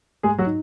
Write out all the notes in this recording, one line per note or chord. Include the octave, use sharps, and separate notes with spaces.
G#2 G#3 G#4
F#3 F#4
D#4